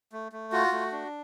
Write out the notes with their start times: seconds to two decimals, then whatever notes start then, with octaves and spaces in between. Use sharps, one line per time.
0.12 A3
0.32 A3
0.52 F4 F#4
0.72 A3
0.92 D4